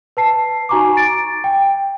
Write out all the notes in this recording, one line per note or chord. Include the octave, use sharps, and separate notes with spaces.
B4 A5 C7
D#4 F#4 G#5 A#5 C#6 D6
A6 D7
G5